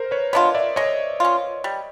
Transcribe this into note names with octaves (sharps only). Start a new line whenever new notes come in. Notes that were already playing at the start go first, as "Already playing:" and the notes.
Already playing: A#4 C5
B4 C#5
B3 D4 F4 C#5 D#5
D5 E5
G#3 C#5 D#5
C#4 F4
G3